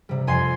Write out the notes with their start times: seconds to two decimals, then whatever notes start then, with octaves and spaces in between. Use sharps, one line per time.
0.09 C3 G3
0.27 F2 G#5 C6